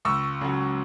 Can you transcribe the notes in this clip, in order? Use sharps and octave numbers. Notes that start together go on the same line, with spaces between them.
C#2 C#6 E6
C#3 F#3